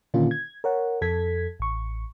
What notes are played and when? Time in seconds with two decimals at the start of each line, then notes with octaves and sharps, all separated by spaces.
0.14 A#2 D3 D#3 A#3 C#4 F4
0.31 G#6
0.64 A#4 C#5 F#5
1.01 F2 A4 G#6 B6
1.60 A1 C#6